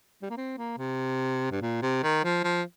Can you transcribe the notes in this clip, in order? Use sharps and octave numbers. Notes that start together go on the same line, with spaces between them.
G3
A#3
C4
A#3
C3
G2
A#2
C3
D#3
F3
F3